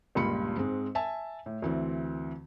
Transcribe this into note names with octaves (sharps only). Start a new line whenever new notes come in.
C#2 G2 A#2 B5 C#7
G#2 G#3 C4
E5 G#5 A5
A2
D2 E3 C4